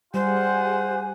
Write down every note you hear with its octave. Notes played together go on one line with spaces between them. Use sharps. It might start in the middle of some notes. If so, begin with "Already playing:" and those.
G3 F4 G4 G#4 C5 F#5 G#5